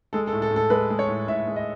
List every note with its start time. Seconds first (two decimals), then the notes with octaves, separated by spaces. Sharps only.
0.13 G#3 A4
0.27 A4
0.33 A2
0.42 A4
0.51 A2
0.56 A4
0.70 G#3 B4
0.90 G#3
0.99 C#5
1.08 A2
1.28 A2 E5
1.47 G#3
1.56 D#5